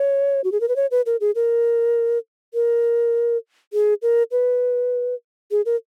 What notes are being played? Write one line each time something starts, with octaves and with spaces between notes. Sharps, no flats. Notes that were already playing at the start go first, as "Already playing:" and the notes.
Already playing: C#5
F#4
G#4
A#4
B4
C#5
B4
A#4
G#4
A#4
A#4
G#4
A#4
B4
G#4
A#4